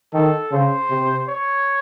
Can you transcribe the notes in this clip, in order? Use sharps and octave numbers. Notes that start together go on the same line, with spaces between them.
D#3 A4
C#3 C5
C3
C#5